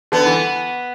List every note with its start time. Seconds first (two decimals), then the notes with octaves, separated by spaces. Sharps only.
0.12 D3 B3
0.26 E3